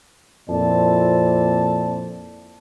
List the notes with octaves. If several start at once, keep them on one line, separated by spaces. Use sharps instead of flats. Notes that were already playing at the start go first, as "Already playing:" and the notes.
F2 A#2 C4 E4 D5 A5